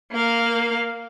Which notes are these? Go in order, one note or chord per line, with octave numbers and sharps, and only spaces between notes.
A#3 F5